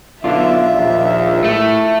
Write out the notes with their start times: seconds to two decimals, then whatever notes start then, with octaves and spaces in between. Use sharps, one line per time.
0.24 B1 D3 D4 F4 E5
0.74 A#1 D#2
1.44 A2 A3